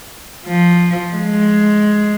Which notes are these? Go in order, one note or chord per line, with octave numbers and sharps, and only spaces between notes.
F3
G#3